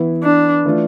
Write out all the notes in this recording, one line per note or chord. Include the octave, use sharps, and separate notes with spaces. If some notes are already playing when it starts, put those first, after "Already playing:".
Already playing: E3 B3 E4
D4
E3 A3 D4 F4